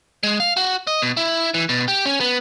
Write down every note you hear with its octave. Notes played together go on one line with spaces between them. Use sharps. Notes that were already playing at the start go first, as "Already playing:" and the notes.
G#3
F5
F#4
D#5
B2
E4
E3
B2
G4
C#4
B3